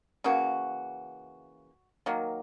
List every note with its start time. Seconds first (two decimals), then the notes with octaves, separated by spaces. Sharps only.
0.24 C#3 E3 A#3 F#4
2.06 D#3 F#3 A#3